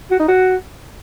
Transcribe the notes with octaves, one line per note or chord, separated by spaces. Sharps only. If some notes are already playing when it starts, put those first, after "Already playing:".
F#4
D#4
F#4